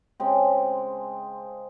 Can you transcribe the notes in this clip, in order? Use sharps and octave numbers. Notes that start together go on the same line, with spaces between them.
C#3 G#3 C4